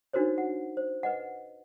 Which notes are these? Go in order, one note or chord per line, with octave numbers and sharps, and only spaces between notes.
D4 D#4 F#4 A#4 C5 C#5
F#5
C5
B4 D#5 F#5